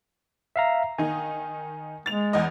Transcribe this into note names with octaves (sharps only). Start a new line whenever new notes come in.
E5 F5 A#5
D#3 D#4 G#5
G#3 A6 F7
E2 D#5